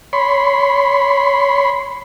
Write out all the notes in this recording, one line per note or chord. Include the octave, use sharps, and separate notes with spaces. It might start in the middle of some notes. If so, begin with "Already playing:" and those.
C#5 B5 C6